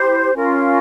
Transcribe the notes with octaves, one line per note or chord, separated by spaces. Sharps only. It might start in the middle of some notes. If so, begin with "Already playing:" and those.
Already playing: E4 G4 C5
C#4 F4 A#4